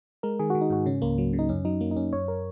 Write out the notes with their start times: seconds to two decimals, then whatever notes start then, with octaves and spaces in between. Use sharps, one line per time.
0.23 G#3 A#4
0.39 D#3 G#4
0.50 D#3 F#4
0.61 D#4
0.70 G#2 F#4
0.86 C#3 C#4
1.02 C#2 A#3
1.18 F#3
1.33 C#3
1.39 D#4
1.49 F#2 C#4
1.65 F#3 D#4
1.81 F#3 A#3
1.91 D#4
1.97 F#2 C#4
2.13 F#2 C#5
2.28 A#4